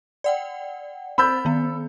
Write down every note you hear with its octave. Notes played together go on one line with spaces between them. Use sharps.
D5 F#5 G5
C4 C5 B5 E6 G6 A6
D#3 B3